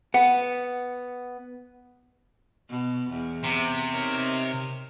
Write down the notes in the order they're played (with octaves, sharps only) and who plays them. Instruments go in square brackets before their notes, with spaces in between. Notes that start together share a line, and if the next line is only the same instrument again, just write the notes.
[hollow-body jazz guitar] B3 F#5
[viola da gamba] B2
E2
[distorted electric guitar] C3
[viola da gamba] D#4 A#4 C#5